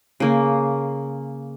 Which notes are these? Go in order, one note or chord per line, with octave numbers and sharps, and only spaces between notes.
C#3 A#3 A#4